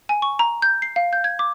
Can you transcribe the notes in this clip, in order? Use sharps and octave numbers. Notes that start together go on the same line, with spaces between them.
G#5
C#6
A#5
G6
C7
F5
G6
G#6
D6